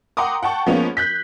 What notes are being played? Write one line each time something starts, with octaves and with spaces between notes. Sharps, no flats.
F#5 G5 A#5 C6 D6 D#6
F#5 G5 A5 C#6
F3 G#3 A#3 B3 C#4
F#6 G6 B6